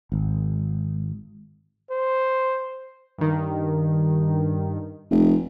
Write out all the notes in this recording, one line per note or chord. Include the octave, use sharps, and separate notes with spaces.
G#1
C5
G2 D#3
F1